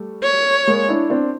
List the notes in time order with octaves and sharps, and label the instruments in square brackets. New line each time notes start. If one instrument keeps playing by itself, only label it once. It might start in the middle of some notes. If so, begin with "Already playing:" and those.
Already playing: [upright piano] G3 A3
[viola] C#5
[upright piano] G#3 A#3
D4 E4
C4 D4